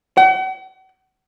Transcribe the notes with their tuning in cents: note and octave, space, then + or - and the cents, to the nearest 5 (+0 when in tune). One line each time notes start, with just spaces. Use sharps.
F#5 +45